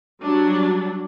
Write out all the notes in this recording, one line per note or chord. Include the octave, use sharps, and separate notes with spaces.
F#3 G3 D4